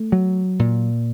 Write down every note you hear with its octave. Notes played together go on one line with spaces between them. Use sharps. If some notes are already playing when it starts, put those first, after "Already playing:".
Already playing: A3
F#3
A#2